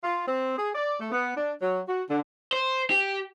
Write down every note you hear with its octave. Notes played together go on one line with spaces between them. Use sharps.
F4
C4
G#4
D5
A3
B3
D4
F#3
F#4
D3
C5
G4